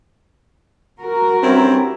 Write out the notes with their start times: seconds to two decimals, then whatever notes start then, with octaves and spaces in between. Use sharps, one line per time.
1.01 F#4 A#4
1.43 G2 C4 C#4 E4